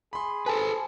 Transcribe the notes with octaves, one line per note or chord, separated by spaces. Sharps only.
G#4 B5 C6
A4 B4 C5 G#5 A5